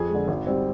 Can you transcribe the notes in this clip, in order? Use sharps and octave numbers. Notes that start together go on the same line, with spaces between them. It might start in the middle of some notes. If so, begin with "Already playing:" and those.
Already playing: F2 G#4 G#5
D3 G#3
G#1
G3 C4